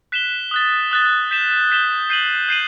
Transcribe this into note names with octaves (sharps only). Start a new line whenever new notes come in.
F#6 B6 E7 G7
D#6 F#6 A6
D#6 F#6 A6
G6 B6 E7 G7
G6 B6 E7 G7
G6 C7 D#7 F#7
G6 C7 D#7 F#7